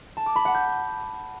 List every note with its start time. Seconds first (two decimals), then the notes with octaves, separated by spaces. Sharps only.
0.17 A5
0.26 D6
0.36 B5
0.45 F#5
0.55 G6